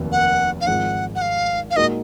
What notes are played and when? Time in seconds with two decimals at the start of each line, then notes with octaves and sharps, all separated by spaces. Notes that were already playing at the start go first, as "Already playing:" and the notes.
Already playing: F1 D#2 D#3 F#3 A#3
0.12 F#5
0.61 F5
0.67 G#1 G#2 F3 G#3 F#5
1.15 F#5
1.22 F5
1.71 F5
1.76 A#2 G#3 D#4 F#4 A#4 D#5